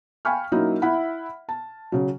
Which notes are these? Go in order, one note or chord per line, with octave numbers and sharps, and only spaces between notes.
F5 G5 G#5 B5 C#6 F6
F#3 A#3 C#4 D#4 E4
E4 E5 F#5 B5
A5
C#3 F#3